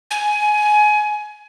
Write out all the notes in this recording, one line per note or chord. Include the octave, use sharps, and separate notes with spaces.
G#5